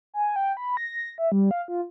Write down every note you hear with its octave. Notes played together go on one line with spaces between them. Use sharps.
G#5
G5
B5
A#6
E5
G3
F5
F4